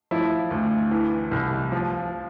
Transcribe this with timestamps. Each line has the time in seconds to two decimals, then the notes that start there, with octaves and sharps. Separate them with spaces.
0.11 F3 E4
0.51 D2
0.91 E3
1.31 C2
1.72 F3